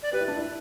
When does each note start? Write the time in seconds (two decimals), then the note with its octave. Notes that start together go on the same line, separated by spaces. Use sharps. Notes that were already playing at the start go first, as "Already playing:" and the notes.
0.03 D5
0.13 G4 B4
0.21 E4
0.28 D4
0.36 E4